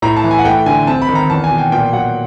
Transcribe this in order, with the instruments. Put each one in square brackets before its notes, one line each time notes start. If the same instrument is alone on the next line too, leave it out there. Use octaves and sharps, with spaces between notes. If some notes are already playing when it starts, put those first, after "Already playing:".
[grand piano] A2 A#5
A5
E3
G#5
F#5
A3 G5
D3 G#5
C4 A5
B5
D#3
A#5
E2 A5
G#5
B2
G5
A#2 G5
F#3 F#5